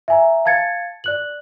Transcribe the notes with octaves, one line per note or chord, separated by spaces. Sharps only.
E5 G#5 A#5
F5 A5 G#6 A6 C#7
D5 F#6 F#7